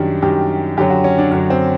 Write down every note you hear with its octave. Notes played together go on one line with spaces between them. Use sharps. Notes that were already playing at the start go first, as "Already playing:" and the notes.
Already playing: F#2 D#3 G3 D4
F#2 D#3 G3 G4
F#2 D3 F#3 G4
F#4
C#4
D4
F#2 D3 F#3 D4
C4